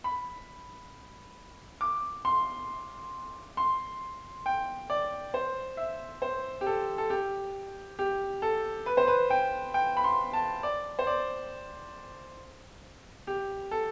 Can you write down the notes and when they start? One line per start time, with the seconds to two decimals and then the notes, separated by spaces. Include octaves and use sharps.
0.04 B5
1.81 D6
2.25 C6
3.57 C6
4.46 G5
4.90 D5
5.34 C5
5.77 E5
6.22 C5
6.61 G4
6.66 A4
6.98 A4
7.10 G4
7.99 G4
8.42 A4
8.86 B4
8.97 C5
9.08 B4
9.30 G5
9.74 G5
9.97 B5
10.04 C6
10.33 A5
10.63 D5
10.99 C5
11.07 D5
13.27 G4
13.71 A4